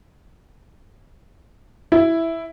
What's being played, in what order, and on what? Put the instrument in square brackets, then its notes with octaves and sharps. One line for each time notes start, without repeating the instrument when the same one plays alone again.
[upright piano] E4